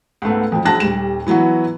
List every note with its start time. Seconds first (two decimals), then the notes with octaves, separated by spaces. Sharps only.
0.22 C#2 G#2 A3 B3
0.52 F2 F3
0.65 F#1 F#3 A5 F#6 A#6
0.80 D#1 G3 E7
1.27 E3 F#3 B3 E4 F#4